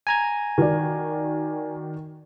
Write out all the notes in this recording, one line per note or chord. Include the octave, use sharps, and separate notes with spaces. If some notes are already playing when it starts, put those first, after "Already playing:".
G#5 A#5 G#6
D#3 F#4 D5